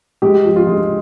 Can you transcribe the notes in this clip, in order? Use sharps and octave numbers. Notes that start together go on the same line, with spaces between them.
G#3 G4
F3
F4
G#3